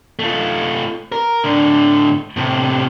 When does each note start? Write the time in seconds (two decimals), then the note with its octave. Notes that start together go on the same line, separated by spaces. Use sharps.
0.19 A3 F4
1.12 A#4
1.44 A2 D3
2.37 A2 C3